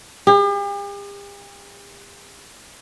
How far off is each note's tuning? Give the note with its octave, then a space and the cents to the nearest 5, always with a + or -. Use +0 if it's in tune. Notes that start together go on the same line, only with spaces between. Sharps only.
G4 +45